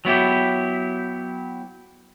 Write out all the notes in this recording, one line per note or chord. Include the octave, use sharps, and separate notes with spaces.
F#3 B3 E4 G4